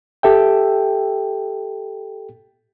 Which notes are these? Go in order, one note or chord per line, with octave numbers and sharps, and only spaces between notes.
G4 A4 E5 G5